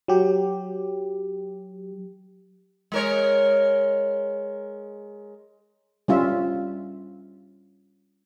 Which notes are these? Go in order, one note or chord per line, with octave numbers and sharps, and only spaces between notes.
F#3 G4
G#3 A#4 C#5
G3 C#4 F4 E5